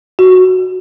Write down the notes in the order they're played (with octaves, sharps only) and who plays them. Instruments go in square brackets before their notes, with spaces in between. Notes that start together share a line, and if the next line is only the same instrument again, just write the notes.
[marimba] F#4